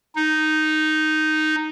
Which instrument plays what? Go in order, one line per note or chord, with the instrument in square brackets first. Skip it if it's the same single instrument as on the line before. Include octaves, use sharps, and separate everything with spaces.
[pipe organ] D#4